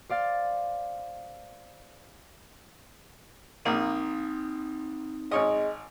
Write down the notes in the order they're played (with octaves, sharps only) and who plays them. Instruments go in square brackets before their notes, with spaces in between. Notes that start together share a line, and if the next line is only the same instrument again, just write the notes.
[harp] C5 D5 F5 A6
[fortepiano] A#1 A#3 [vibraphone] C4 D#4
[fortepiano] G#1 C#5 D#5 [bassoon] G#3